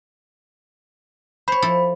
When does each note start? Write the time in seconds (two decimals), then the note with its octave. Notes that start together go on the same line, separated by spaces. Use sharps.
1.48 C5 C#5 B5
1.62 F3 E4 A4